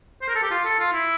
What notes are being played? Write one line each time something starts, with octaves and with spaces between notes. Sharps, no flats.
C5
A#4
A4
G4
F4
A4
F4
E4